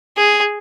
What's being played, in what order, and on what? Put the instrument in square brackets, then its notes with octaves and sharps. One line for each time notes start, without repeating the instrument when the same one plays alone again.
[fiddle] G#4